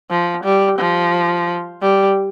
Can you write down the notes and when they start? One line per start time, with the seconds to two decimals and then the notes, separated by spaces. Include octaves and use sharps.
0.10 F3
0.44 G3
0.79 F3
1.82 G3